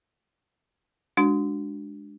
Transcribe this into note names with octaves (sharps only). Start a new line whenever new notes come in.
G#3 D4 F#4